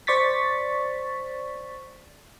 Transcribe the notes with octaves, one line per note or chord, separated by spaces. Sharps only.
C5 D5 C#6 A6 B6